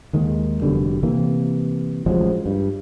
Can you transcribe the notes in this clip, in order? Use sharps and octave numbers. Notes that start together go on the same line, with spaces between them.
D#2 D#3 G#3
F1 B2 D3 G3
C3 E3 A#3
A1 F3 F#3 G#3
G2